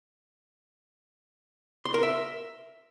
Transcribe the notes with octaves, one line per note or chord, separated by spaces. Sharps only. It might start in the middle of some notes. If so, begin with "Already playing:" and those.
C6
A#4
E5